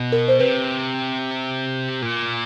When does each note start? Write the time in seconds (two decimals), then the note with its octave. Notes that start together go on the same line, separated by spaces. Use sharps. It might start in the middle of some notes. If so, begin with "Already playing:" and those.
Already playing: B2
0.12 A#4
0.28 C5
0.39 C3 B4
2.02 A#2